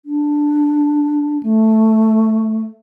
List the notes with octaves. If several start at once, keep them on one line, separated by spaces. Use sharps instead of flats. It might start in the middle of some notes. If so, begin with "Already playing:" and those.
D4
A3